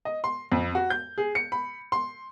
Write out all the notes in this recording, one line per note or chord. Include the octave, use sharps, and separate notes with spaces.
D#5
C6
F2
F#4
G6
G#4
C#7
B5
C6